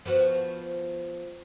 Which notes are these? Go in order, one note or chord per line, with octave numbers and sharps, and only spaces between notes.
F3 B3 F#4